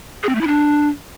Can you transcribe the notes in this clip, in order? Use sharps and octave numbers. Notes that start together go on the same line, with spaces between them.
G#4
C4
A3
E4
D4